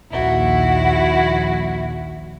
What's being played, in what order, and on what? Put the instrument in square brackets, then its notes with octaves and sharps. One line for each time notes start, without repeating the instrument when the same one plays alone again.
[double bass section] A#1 D#2 [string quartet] E4 F#4